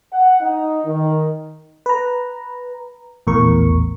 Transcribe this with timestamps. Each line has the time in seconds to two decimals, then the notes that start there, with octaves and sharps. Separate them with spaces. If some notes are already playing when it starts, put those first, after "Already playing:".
0.12 F#5
0.41 D#4
0.85 D#3
1.86 B4 A#5
3.27 A#1 E2 A2 A#4 C#6